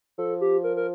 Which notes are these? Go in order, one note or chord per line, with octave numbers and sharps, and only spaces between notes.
F3 A4
G4
A#4
A#4